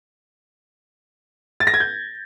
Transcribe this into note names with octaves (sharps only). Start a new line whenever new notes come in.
A6
A#6
G#6
G6